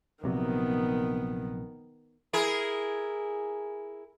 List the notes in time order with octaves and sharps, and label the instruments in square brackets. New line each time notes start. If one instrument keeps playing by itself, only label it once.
[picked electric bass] A#1 C3 F#3 [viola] D#3 B3
[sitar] E4 G#4 A#4